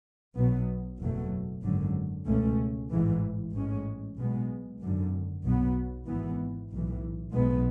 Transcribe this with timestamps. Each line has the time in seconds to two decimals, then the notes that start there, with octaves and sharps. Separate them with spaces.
0.36 B1 B2 F#3 B3
0.99 F#1 E2 B2 F#3 A3
1.63 G#1 F#2 D3 F#3
2.26 C#2 B2 A3 C#4
2.91 A1 G#2 E3
3.54 A1 G#2 G#3 C#4
4.17 B1 B2 G#3 B3
4.81 G#1 F#2 D3
5.43 B1 B2 F#3 B3
6.08 G#1 G#2 E3 B3
6.71 B1 A2 E3
7.34 B1 B2 G#3 B3